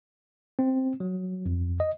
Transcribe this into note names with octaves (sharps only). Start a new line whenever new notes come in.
C4
F#3
F2
D#5